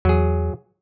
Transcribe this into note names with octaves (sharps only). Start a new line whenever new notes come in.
E2 F#3 G#4